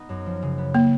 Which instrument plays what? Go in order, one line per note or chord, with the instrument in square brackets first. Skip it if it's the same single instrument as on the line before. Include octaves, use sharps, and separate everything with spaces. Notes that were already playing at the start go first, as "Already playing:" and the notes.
Already playing: [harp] B3 D#4
F#2
F3
C#3
B3
[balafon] A#3